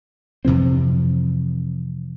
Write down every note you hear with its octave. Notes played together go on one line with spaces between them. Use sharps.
F2 C3 E3 C4